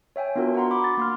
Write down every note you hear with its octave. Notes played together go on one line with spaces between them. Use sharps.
C#5 E5 G5 G#5
B3 D4 F4 F#4 A#4
F#4 F#5 A#5 C6
B5 D6
A6
A#3 C6 F6